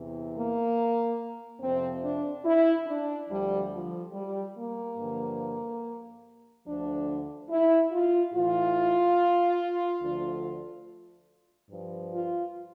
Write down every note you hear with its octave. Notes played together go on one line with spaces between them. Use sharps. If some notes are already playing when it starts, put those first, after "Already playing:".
Already playing: E2 C3 E3
A#3
F2 C3 F3 C4
D4
E4
D4
D2 D3 F3 G3
F3
G3
A#3
G2 D3 F3
D2 D3 F3 D4
E4
F4
A2 E3 F4
D2 D3 F3
G2 F3
F4